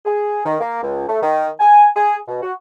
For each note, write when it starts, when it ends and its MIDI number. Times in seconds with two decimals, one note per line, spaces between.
0.05 0.41 68
0.46 0.55 51
0.60 0.82 58
0.83 1.05 37
1.09 1.19 57
1.23 1.49 51
1.60 1.86 80
1.96 2.17 68
2.28 2.39 47
2.42 2.52 66